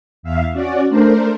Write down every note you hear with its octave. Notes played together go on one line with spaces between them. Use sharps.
E2 E5 F5
C#4 F#4 D5
A3 D4 A#4 C5